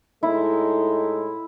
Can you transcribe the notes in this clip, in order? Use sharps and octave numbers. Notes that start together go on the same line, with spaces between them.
A2 G#3 D#4 E4 A4